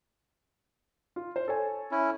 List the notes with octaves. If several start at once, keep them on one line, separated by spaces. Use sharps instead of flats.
F4
C5
A4 C#5 G#5
C#4 E4